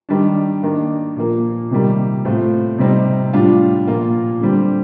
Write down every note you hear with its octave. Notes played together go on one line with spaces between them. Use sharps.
D#3 G3 D4
D#3 A#3 D4
A#2 F3 A#3
C3 D#3 G3 A#3
A2 A3 C4 F4
C3 G3 C4 D#4
A2 G3 D4 F4
A#2 F3 A#3 F4
D3 G3 C4